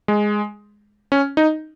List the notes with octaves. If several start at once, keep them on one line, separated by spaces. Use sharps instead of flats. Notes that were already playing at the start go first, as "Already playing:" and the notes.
G#3
C#4
D#4